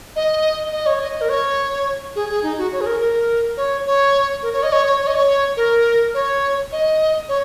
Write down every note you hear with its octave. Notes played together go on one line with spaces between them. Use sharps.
D#5
D#5
C#5
D#5
A#4
C#5
G#4
G#4
D#4
F#4
C#5
G#4
A#4
A#4
C#5
C#5
A#4
C#5
D#5
C#5
C#5
C#5
D#5
C#5
A#4
C#5
D#5
C#5